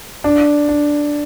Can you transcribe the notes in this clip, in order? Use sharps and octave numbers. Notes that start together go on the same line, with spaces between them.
D4
D4